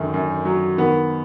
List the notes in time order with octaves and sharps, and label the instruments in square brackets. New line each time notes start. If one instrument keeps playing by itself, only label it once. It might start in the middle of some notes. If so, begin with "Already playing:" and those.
Already playing: [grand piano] F#2 D#3 [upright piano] D3
[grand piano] F#2
F#3
[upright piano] D#3 [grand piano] B3